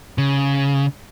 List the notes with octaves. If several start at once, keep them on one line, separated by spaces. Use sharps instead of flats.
C#3